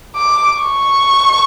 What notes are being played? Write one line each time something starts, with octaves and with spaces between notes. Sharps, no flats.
D6
C#6